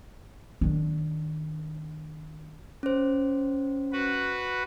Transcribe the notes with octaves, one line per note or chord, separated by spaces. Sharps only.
D#3 D4
C#4 C5
F#4 B4